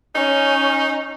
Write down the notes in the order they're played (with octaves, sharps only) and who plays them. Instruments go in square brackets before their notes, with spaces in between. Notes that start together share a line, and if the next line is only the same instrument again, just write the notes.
[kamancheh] C#4 [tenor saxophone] D#4